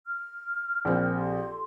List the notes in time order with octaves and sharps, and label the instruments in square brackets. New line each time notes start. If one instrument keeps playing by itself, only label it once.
[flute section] F6
[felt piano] A#1 C4 [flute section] A#4 F6
[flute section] G4 A4 C6